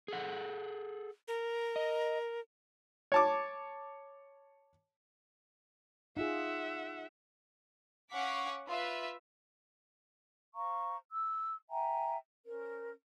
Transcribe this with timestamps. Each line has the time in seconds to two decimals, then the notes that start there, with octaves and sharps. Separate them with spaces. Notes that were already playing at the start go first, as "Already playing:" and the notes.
0.08 G#4 A4 F#5
1.28 A#4
1.76 D#5
3.12 C#5 A5 D6
6.17 D#4 F4 G#4 E5 F#5
8.11 C#4 F5 F#5 C#6 D6 B6
8.68 F4 B4 E5
10.55 C5 F5 A#5 C#6
11.11 E6
11.69 E5 G5 G#5 A#5
12.45 C#4 A#4 C5